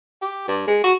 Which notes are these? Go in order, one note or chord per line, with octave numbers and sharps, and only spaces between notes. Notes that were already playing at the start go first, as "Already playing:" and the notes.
G4
G2
G#3
F#4